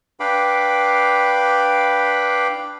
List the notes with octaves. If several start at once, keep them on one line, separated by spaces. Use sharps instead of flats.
D4 B4 F5 G5 B5 D6